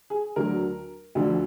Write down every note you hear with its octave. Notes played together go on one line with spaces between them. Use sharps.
G#4
D2 D3 F#3 A#4
D2 D3 F3